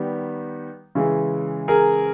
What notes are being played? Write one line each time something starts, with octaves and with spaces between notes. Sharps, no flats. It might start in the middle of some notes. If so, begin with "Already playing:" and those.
Already playing: D#3 G3 B3
C#3 E3 G#3
G#4 A#4